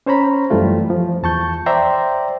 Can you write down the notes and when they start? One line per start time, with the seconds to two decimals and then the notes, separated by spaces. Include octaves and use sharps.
0.06 C#4 C5 C#5 A#5 B5
0.50 F#2 E3 G3 A3 F4
0.90 F3
1.23 E2 A5 C#6 G6
1.66 C5 D5 E5 G5 A#5 C6